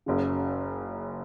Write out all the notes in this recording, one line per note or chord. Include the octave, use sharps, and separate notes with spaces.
F#1 F#2 C#3